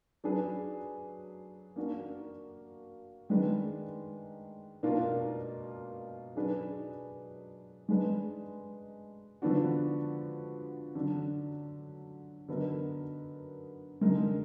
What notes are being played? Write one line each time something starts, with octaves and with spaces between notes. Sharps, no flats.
F#3 D4 G#4 B4
A#3 D4 F#4 A#4
D#3 G#3 D4 G#4 B4
B2 A#3 D4 F4 A#4
F#3 D4 G#4 B4
G#3 D4 G#4 B4
D3 F3 B3 D4 F#4
D3 F#3 D4
D3 F#3 B3 D#4 A#4
D3 G#3 D#4 A#4